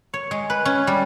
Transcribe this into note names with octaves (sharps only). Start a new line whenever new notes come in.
C#5
G#3
B4
C#4
G3